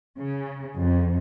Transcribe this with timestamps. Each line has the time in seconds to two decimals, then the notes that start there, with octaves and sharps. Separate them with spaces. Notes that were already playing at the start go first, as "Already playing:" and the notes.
0.19 C#3
0.78 F2